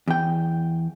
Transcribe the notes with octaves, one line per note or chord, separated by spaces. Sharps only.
E2 G5